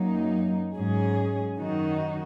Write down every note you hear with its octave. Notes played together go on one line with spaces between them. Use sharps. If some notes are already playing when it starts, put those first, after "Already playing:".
Already playing: F#2 F#3 A#3 D#4
G#2 F#3 C#4 G#4
F#2 D#3 F#3 D#4 F#4